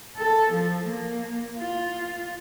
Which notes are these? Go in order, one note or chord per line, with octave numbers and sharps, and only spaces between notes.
A4
F3
A#3
F4